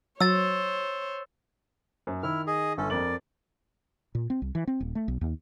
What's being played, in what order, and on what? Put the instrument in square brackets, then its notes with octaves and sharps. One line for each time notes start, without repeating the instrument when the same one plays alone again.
[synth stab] F#3 [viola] C5 C#5 [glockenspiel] E6 A6
[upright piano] F#2
[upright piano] D#3 [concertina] E4 F6
[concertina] G#4 D#5
[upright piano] G1 [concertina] C#4 A4
[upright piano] F2 A#4 F#7 [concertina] D5
[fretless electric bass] A#2
C4
C2
E3
C4
D#1
A3
B1
D#2